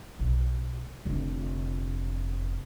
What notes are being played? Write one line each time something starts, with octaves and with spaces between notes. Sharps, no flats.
B1
F1 D3